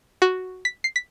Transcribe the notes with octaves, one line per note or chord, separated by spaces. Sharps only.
F#4
B6
C7
B6